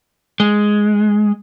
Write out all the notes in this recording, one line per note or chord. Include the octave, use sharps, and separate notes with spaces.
G#3